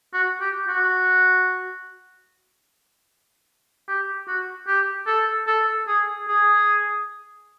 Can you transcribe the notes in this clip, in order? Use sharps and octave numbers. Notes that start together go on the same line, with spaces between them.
F#4
G4
F#4
G4
F#4
G4
A4
A4
G#4
G#4